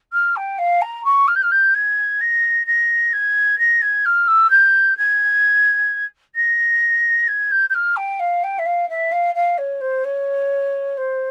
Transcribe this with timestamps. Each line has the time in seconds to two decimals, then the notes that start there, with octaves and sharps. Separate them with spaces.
0.13 F6
0.36 G5
0.58 F5
0.81 A#5
1.04 C#6
1.27 F6
1.35 G6
1.42 F6
1.51 G6
1.74 G#6
2.21 A#6
2.66 A#6
3.13 G#6
3.58 A#6
3.81 G#6
4.05 F6
4.27 E6
4.50 G6
4.97 G#6
6.35 A#6
7.27 G#6
7.51 G6
7.69 G6
7.74 F6
7.96 G5
8.19 F5
8.43 G5
8.58 E5
8.65 F5
8.89 E5
9.11 F5
9.35 F5
9.57 C#5
9.80 C5
10.04 C#5
10.97 C5